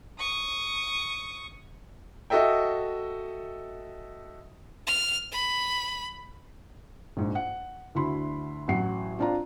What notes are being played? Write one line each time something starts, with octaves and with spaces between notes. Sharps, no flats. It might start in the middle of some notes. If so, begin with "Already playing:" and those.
C#6 D#6
F#4 A4 D#5 E5 G5
F6
B5
A#1 G#2
F#5
D2 D3 E4 F#4 B5 C6
A1 F#3 F#5 C7
C4 D4 F4 D5 A#5